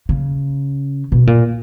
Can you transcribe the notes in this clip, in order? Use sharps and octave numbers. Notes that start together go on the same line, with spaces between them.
C#3
B2
A#2